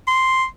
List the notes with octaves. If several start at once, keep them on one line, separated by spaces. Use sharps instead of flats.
C6